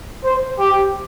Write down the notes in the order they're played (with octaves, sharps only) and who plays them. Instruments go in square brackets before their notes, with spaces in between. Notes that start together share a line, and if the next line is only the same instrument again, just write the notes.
[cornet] C5
G4